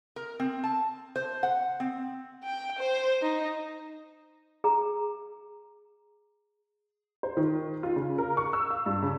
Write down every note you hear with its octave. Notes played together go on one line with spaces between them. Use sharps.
A#4
C4
A5
C5
F#5
C4
G5
C5
D#4
G#4 A#5
C5
D#3
F4
C#3
A#4
C#6
E6
F5
G2
C#3